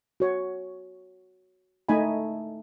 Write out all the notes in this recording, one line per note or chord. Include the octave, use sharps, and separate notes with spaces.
F#4 C#5
A3 D#4 D#5 G#5 B5